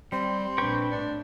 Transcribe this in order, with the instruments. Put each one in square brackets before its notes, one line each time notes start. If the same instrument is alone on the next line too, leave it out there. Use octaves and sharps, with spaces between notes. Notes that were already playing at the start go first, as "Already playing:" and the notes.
[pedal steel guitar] G3 [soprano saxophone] C4 [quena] C6
[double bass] A#1 D4 [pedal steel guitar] B4 G5 C#6
[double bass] A2 [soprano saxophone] D4